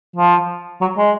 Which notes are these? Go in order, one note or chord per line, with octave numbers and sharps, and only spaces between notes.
F3
F#3
G#3